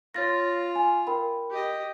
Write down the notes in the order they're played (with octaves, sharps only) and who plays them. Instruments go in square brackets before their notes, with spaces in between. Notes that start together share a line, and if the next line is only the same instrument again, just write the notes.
[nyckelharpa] F4 [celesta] C#5 A6 A#6
[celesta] G#5
A#4 G5 B5
[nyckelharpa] G4 D#5